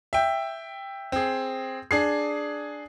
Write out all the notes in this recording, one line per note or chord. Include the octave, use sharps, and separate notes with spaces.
E5 G5
C4 G#4
D4 G#4 C7